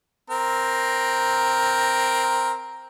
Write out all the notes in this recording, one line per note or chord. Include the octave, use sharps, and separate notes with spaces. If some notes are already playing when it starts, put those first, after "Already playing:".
C4 A#4